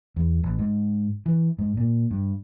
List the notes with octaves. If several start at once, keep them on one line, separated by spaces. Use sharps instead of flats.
E2
A1
G#2
E3
G#2
A#2
G2